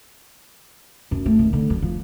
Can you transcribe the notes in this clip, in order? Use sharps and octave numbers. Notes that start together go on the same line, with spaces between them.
F#2
A3
D#3
D3
F#3
F3